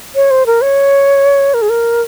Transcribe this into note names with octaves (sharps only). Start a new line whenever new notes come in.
C#5
C5
A#4
C#5
A#4
G#4
A#4